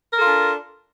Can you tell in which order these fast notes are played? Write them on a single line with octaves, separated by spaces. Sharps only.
A#4 A4 F4 D4